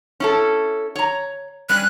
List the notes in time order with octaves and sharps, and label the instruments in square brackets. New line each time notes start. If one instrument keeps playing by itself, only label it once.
[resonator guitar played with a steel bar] C#4 E4 A4
C#5 A#5
[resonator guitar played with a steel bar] G3 C#4 [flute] F#6